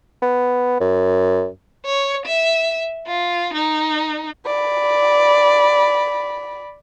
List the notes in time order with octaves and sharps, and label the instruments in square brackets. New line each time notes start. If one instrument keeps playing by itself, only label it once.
[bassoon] B3
F#2
[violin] C#5
E5
F4
D#4
[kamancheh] D5 B5